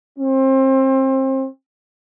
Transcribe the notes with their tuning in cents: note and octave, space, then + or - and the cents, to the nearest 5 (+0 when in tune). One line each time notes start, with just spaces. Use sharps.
C4 +30